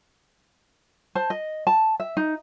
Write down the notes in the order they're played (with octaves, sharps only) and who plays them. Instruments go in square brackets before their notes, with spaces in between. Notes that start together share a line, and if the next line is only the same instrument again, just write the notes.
[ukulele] C5 A5
D#5
A5
E5
D#4